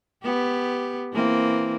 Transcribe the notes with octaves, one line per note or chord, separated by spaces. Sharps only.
B3 G4
E3 A#3 C4